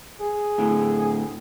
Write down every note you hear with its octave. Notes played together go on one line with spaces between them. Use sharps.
G#4
A2 D3